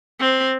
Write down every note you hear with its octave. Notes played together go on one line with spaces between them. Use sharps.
C4